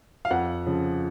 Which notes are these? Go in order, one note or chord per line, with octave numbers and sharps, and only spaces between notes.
F5
F2 F#5
C#3 F3